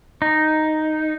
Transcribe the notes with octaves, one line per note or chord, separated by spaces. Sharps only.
D#4